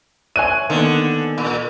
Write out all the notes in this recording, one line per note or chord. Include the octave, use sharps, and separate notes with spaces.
C5 C#5 E5 G#5 F#6 D#7
D3 D#3 A#3 B3
A#2